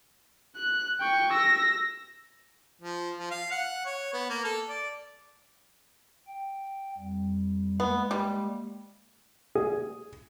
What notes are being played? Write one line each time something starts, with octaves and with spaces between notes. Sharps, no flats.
F#6
G5 C#6
E6 A#6
F3
F3
F5
F#5
C#5
B3
A#3
A4
D5
G5
F2 G3
G#3 A#3 B3
G3
G#4